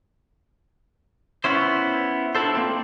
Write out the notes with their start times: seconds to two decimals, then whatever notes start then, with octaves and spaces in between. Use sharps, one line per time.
1.44 B3 C#4 E4 C5
2.35 D4 E4 F4 A4 C5
2.55 A#3 C4